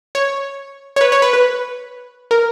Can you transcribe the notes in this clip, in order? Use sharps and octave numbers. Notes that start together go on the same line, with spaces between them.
C#5
C#5
B4
C#5
B4
B4
A#4